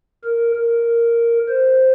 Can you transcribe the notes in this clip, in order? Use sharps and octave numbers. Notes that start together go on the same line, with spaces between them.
A#4
A#4
C5